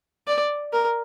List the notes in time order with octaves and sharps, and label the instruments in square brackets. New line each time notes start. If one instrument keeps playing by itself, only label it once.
[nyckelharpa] D5
A#4